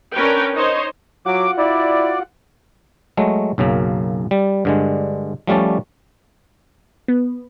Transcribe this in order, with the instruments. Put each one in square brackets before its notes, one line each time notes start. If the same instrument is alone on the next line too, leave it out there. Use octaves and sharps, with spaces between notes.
[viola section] C#4 D4 A#4 B4 C#5 G5
D#4 C5 C#5 D#5
[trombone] F#3 [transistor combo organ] F4 F#4 F#5 [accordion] D6
[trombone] E4 [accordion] D5
[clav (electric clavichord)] F#3 G#3 A3
B1 F#2 C#3 A#3
G3
G2 D3 G#3
F3 G3 A3 C#4 D5
[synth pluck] B3